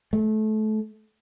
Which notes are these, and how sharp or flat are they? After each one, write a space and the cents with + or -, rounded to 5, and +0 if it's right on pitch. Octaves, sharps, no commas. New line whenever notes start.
A3 -25